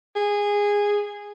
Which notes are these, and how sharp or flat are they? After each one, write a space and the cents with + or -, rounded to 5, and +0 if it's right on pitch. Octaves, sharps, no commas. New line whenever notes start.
G#4 -15